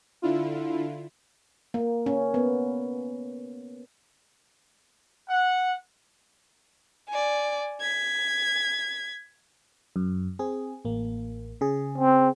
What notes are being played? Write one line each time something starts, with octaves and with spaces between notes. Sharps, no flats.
D3 E4 F4
A#3
C#4
B3
F#5
D5 G#5
G#6 B6
F#2
C4 G#4
A1 A#3
C#3 G#4
C4